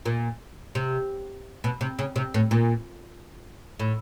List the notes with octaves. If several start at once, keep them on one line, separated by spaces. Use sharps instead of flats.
A#2
C3
B2
C3
C#3
C3
A2
A#2
A2